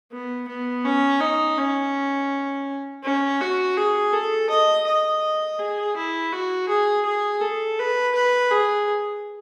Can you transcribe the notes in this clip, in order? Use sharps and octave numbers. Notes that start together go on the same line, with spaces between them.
B3
B3
C#4
D#4
C#4
C#4
F#4
G#4
A4
D#5
D#5
G#4
E4
F#4
G#4
G#4
A4
B4
B4
G#4